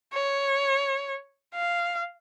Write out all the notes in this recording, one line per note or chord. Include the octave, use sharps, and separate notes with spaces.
C#5
F5